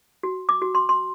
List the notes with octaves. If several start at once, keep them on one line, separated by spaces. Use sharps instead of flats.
F#4
D6
F#4
C6
C6